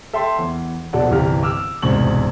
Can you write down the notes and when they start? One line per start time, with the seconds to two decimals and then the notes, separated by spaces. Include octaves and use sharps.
0.13 A4 E5 G5 A5 C6
0.38 E2
0.93 A#1 B2 A4 D5 F#5
1.11 G1 C2 E3 G4 F5 F6
1.43 D6 E6 F6
1.82 E1 C2 G#2 C#6 F#7